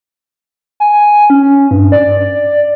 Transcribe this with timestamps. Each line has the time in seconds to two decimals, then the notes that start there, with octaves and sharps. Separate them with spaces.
0.80 G#5
1.30 C#4
1.71 G2
1.92 D5